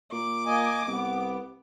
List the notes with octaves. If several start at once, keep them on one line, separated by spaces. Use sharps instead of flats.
A#2 D6
A#3 D#5 G#5
C2 B3